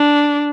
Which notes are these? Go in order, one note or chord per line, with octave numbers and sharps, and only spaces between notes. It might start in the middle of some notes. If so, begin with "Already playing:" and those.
Already playing: D4